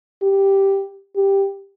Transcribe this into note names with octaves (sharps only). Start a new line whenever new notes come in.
G4
G4